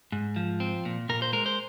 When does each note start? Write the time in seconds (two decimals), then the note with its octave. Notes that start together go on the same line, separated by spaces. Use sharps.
0.12 G#2
0.36 F3
0.60 C4
0.85 A#2
1.09 A#2 A#4
1.22 C5
1.33 G#3 A#4
1.46 C5